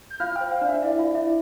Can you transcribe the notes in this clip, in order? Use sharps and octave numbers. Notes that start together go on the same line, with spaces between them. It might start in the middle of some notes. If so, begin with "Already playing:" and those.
G6
F4 F5 F6
C5 G5
F5
D4 D5
E5
E4 D5 E5
F4 F5
E4 E5